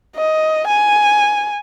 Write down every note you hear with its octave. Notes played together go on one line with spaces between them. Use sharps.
D#5
G#5